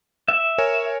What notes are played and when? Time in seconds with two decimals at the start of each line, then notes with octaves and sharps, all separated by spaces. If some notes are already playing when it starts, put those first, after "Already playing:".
0.28 E5
0.58 A#4 C#5 G#5